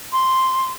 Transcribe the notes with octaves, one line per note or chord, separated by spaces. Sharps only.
C6